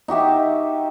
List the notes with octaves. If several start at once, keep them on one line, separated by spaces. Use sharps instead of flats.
D#4 F#4 G4 E5